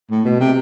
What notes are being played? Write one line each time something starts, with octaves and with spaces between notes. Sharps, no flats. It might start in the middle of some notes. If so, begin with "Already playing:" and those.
A2
B2
C3